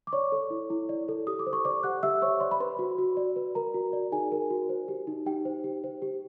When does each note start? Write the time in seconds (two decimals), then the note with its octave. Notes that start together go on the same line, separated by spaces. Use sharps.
0.07 D6
0.13 C#5 D5 C#6
0.32 A4
0.50 E4
0.70 E4
0.89 D5
1.08 A4
1.27 G4 D#6
1.39 D6
1.47 C5
1.53 C#6
1.65 C5 D5 D6
1.83 G4 F#5 F#6
2.03 G4 E5 E6
2.22 C5 C#5 C#6
2.40 D5 C6
2.51 B5
2.60 B4 C5 C6
2.79 F#4
2.98 F#4
3.17 D5
3.36 B4
3.55 A#4 A#5
3.74 F#4
3.93 D5
4.12 D#4 G#4 G#5
4.32 A#4
4.50 F#4
4.69 C5
4.88 G4
5.07 D#4
5.26 D#4 G4 G5
5.45 C5
5.64 G4
5.84 C5
6.02 G4